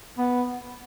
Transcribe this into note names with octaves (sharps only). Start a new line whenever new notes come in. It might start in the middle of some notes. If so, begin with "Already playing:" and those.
B3